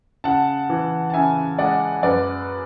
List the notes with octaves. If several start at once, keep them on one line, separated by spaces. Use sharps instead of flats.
C#3 F#5 A5
E3
A5
C#3 E5 G#5
G#3 D5 F#5
F#2 B4 D5